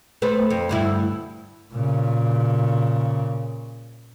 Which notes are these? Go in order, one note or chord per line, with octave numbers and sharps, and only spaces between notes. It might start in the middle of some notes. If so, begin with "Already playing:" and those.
A3 B4 C5
F2
D2 G2 E4
A#2 C#3